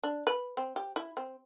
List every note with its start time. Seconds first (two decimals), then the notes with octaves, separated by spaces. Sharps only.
0.04 D4
0.27 B4
0.57 C4
0.76 G4
0.96 E4
1.17 C4